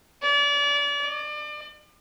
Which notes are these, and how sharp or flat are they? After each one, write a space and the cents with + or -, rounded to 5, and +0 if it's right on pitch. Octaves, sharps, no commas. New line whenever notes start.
D5 -35
D5 +30